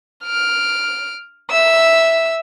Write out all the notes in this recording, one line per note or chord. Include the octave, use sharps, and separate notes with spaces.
F6 D7
E5 E6